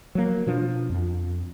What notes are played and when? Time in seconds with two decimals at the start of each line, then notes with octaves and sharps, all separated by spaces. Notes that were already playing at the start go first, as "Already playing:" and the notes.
0.15 F#3 A#3
0.47 B2 F3 D4
0.90 F2